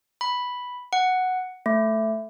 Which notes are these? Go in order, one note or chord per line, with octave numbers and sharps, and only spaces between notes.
B5
F#5
A3